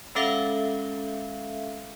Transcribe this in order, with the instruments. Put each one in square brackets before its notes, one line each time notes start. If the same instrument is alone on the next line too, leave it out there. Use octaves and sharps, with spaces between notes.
[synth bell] G#3 C#4 A4 E5 F5